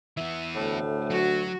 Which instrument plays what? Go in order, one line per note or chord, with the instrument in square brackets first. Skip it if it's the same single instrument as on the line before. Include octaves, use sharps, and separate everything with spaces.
[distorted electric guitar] E3 B3 [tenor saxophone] E5
[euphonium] D2 [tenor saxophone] A2
[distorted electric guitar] F#3 [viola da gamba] F#4